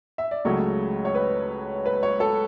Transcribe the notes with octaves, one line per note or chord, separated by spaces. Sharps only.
E5
D5
C#2 C#3 F#3 A3 C#5
C#5
B4
B4
C#5
A4